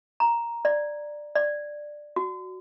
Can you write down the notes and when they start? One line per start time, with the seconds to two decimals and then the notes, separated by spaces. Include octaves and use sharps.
0.20 A#5
0.65 D5
1.35 D5
2.16 F#4